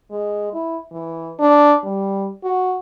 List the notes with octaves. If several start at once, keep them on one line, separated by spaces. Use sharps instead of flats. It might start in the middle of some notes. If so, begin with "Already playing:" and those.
G#3
E4
E3
D4
G3
F#4